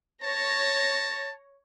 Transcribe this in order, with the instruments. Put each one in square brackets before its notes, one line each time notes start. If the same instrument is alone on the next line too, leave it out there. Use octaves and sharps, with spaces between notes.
[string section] C#5 A#6 [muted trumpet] A5